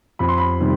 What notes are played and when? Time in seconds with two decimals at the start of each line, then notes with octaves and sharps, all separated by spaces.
0.19 F2 B5
0.28 C6
0.38 B5
0.60 C3 D#3 G3